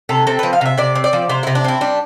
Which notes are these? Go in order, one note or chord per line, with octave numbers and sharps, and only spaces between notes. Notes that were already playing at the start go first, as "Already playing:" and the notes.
C3 A4
C4 A4
F3 B4
F5
C3 E5
C3 D5
C4
D5
F3
C3 C5
C3 E4
D4
C4 E4
G3 D4